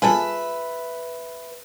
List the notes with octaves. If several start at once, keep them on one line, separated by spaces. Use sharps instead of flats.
F4 G#4 A4 B4 E5